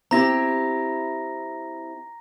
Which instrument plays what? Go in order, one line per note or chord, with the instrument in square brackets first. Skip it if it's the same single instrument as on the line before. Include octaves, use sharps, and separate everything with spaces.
[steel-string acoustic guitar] C4 E4 G4 [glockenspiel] A#5 A#6